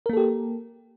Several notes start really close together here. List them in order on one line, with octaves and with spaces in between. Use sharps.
A#4 A#3 A4 G4